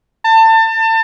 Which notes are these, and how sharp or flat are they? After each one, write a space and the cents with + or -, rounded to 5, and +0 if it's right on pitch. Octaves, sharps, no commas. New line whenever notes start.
A5 +30